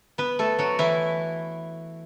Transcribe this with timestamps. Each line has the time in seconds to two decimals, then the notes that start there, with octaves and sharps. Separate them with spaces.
0.18 B3 B4
0.39 A3 A4
0.59 F#3 F#4
0.79 E3 E4